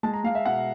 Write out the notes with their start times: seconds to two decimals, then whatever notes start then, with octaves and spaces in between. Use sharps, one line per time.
0.03 G#3 A5
0.13 A#5
0.24 G#3 F5
0.35 E5
0.46 B2 F#5